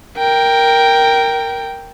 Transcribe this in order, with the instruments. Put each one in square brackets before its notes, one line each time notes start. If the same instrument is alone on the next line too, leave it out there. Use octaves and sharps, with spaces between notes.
[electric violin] A#4 G5